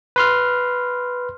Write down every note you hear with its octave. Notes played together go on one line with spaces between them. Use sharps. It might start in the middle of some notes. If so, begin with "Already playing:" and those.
B4 C6 F6